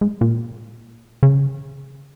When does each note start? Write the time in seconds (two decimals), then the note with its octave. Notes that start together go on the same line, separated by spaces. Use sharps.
0.01 G#2
0.21 A#2
1.23 C#3